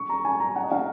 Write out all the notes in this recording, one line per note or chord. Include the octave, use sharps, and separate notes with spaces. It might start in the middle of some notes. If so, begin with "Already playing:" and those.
Already playing: C#6
A#5
G#5
A#5
F#5
D#5
F5